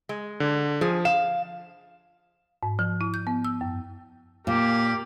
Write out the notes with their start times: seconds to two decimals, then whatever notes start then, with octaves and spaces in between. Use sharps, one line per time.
0.09 G#3
0.40 D3
0.81 F3 G#4
1.05 F5 E7
2.63 G#2
2.79 F3
3.01 E4
3.14 G6
3.27 B3
3.45 E6
3.61 F#2
4.47 A#2 A#3 G4